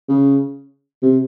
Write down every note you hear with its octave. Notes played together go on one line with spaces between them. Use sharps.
C#3
C3